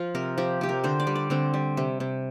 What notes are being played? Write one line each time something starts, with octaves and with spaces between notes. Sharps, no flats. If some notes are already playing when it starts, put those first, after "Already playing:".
Already playing: F3 F4
C3 A#4
F3 G4
C3 G4
A#4
D3 C5
D5
G3
D5
D3 C4
G3
C3
C3